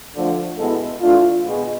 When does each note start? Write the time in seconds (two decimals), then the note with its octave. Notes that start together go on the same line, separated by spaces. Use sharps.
0.15 D3 F3 A3
0.58 B2 G#3 B3 E4 A4
1.01 E3 A3 D4 F4
1.44 B2 G#3 B3